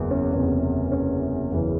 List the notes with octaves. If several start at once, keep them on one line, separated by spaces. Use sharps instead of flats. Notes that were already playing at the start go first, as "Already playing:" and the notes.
Already playing: F#1 E2 C#3
C#4
F#1 E2 C3
C#4
F#1 E2 C#3 E3